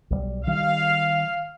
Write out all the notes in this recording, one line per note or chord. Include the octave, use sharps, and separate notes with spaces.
B1 F3 G3
D#3 G3 F5